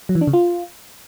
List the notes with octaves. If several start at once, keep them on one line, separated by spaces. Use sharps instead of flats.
F#3
E3
D4
C#3
F4